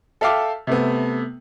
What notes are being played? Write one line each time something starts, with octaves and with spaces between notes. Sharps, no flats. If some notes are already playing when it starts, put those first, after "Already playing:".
A4 E5 F5 G5 D6
C3 A3 B3